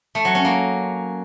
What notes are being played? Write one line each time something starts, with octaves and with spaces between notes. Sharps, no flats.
A3
F#3
C#4
A#3